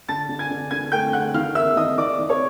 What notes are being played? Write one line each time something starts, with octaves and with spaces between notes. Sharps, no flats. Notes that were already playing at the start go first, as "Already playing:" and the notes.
D3 A5 A6
D3
G#5 G#6
D3
D3 G#5 G#6
A3 G5 G6
D3 F#5 F#6
D#3 F5 F6
A#3 E5 E6
D#3 D#5 D#6
D#3 D5 D6
D#3
C#5 C#6